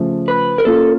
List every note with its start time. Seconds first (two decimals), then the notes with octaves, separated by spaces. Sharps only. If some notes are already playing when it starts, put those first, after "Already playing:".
Already playing: C#3 F3 A3
0.28 B4
0.58 A#4
0.65 A#3 C#4 F4 A4